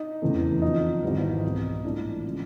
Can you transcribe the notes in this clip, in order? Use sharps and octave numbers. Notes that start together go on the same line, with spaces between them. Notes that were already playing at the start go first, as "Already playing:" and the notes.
Already playing: D#4
F1 E2 C#3 E3 A3
F2 D3 F3 D#4
G#1 G#2 E3 G3 B3
C2 B2 G#3
A#1 A2 E3 A3 D4
C#3 F3 G#3